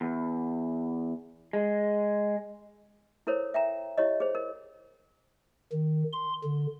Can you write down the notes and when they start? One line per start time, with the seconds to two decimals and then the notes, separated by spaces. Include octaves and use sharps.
0.01 E2
1.53 G#3
3.27 E4 A4 A#4 C5 C#5
3.54 E5 G5 A#5
3.98 E4 G4 C#5 D#5
4.20 G#4 C5
4.35 A#4
5.72 D#3
6.13 C6
6.44 D3